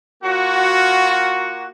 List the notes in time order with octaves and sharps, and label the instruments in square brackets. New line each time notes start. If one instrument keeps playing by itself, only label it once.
[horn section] A#3 F4 F#4